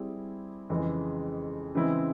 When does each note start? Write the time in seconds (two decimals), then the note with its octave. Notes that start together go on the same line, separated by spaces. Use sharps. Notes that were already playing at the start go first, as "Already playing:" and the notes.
Already playing: G3 C4 E4 G#4
0.69 F2 C#3 E3 G#3
1.75 C#3 E3 G#3 C4 E4